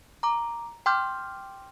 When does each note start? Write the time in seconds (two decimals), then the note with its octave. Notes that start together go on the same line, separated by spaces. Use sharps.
0.23 A#5 D6
0.86 G5 C6 D6 F6 G6